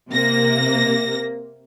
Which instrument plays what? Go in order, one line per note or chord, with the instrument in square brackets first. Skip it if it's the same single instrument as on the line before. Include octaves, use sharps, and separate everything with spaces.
[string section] C3 A#3 A#6